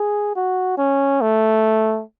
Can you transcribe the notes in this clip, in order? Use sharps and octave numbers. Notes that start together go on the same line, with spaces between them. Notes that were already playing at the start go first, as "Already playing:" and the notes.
Already playing: G#4
F#4
C#4
A3